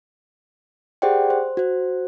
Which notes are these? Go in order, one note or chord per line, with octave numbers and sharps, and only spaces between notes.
G4 G#4 C5 D5 F#5 G5
C5
F#4 C5